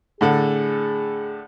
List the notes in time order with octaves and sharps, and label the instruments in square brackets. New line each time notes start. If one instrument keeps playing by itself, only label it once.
[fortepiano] A2 D3 A4 [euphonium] G#4